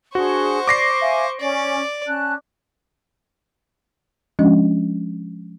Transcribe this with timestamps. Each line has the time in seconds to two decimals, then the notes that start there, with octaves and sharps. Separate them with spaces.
0.15 D4 F#4 G#4 C5 C#6
0.67 D5 D6 A#6 C7
1.00 E5 F5 G#5
1.40 C#4 D5
2.07 C#4 A5 F#6
4.39 F3 G#3 C#4 D4 F#4 D#5